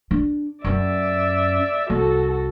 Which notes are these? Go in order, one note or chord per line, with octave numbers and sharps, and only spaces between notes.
D4
F#2 C#4 D5 E5
C2 F#4 A4